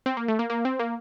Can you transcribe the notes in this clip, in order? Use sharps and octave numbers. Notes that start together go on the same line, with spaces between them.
C4
A#3
A3
A#3
A#3
C4
A#3